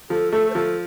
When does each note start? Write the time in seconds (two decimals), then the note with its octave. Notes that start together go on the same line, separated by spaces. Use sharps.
0.10 F3 A4
0.32 A3 A4
0.50 C5
0.55 F3 A4